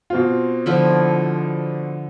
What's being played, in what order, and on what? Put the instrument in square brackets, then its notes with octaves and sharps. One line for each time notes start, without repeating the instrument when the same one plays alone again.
[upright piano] B2 C4 F4
[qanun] D3 F3 E4